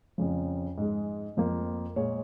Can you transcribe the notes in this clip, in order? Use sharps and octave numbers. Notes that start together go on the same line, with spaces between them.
F2 C#3 F3
G#2 G#3
F2 F3 A#3
A#2 G#3 C#5